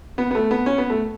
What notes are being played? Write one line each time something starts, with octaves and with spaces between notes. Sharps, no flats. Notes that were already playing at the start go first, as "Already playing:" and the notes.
B3
B3
A3
B3
C#4
B3
A3